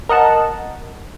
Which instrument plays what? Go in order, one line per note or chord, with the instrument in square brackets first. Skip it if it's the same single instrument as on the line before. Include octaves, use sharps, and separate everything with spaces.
[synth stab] A#4 D#5 F#5 A5